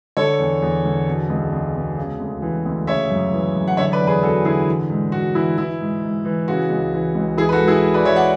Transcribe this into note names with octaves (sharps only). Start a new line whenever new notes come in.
D3 A4 C#5
E2
E2
D3
B2
C#2
C#2
B2
C#3
D2
E3
D2
C#3 C#5 E5
F#2
E3
F#2
F#5
D3 C#5 E5
B4 D5
E2
G#4 B4
E2 F#4 A4
D3 E4 G#4
E3
G#2
G#2 F#4
E3 E4
E3 E4
G#2
G#2
E3
C#3 F#4
C#2
E3
C#2
E3 E4 G#4
B4
F#4 A4
G#2
E4 G#4
G#2
B4 D5
E3 C#5 E5
D5 F#5